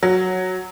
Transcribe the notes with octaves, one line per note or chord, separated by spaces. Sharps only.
F#3